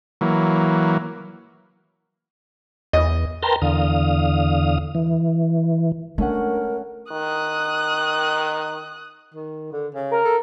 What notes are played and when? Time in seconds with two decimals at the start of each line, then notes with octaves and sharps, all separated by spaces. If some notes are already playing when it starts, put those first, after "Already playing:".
0.21 E3 F#3 A#3
2.93 E2 D#5
3.43 A#4 B4 G5 A5 A#5 C6
3.62 E2 D3 F5 D#6
4.95 E3
6.18 A3 C#4 D4 A#4 F#5
7.12 D#3 D#6 F#6
9.34 D#3
9.72 D3
9.95 C#3
10.11 A#4
10.25 A4